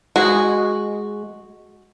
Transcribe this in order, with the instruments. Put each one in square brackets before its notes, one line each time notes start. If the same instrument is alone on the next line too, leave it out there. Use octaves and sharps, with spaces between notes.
[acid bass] G#3 [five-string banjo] F#4